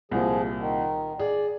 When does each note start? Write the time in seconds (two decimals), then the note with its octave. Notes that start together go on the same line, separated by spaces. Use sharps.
0.11 C2 A#2 F3 G#4
0.59 D#3
1.19 G#4 D5